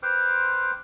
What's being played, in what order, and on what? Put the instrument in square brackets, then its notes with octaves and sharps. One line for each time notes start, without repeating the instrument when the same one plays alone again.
[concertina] B4 C5 G5 C6 D6 F6